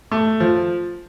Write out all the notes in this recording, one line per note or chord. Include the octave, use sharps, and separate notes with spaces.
A3
F3